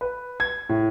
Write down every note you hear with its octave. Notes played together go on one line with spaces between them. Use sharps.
B4
G#6
A2